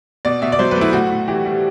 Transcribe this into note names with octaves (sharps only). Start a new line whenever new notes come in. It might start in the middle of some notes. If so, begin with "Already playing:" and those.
B2 D5
B2 E5
D5
F#3 C5
A3 B4
E4
A2 F#4
A2
E3 G4
G3